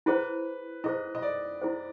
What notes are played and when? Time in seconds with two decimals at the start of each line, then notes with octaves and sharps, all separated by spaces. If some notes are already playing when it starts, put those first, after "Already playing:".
0.06 E4 G#4 B4 C5
0.84 E4 G#4 C5 D#5
1.15 D#5
1.22 D5
1.62 E4 G#4 C5